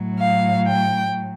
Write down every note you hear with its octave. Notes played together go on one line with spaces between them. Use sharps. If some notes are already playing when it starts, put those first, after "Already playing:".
Already playing: A2 F#3
F5
G5